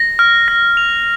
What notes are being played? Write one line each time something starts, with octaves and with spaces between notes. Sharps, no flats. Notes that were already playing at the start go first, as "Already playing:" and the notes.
Already playing: A#6
F6
A#6
F7